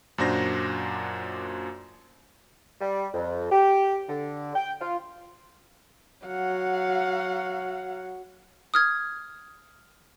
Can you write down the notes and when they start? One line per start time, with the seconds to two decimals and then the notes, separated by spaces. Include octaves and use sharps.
0.18 F#2 A#2 D4 F#4 C5 A#6
2.80 G3
3.14 F2
3.50 G4
4.09 D3
4.55 G5
4.80 F4
6.27 F#3 F5 F#5
8.74 D#6 F6 G#6